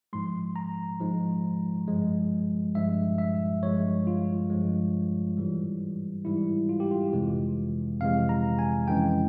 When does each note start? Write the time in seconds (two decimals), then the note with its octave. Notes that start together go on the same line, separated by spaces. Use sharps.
0.13 G#2 F3 G#3 C6
0.56 A#5
1.00 G#2 F3 G#3
1.87 G2 F3 G#3
2.75 G2 F3 G#3 E5
3.18 E5
3.63 G2 F3 G#3 C#5
4.07 F4
4.50 G2 F3 G#3
5.37 G#2 E3 G3
6.25 G#2 E3 G3 E4
6.69 F4
6.80 G4
6.91 F4
7.13 F2 C3 E3 G#3
8.01 F2 C3 E3 G#3 F5
8.29 A#5
8.59 G#5
8.88 F2 C#3 E3 G#3 G5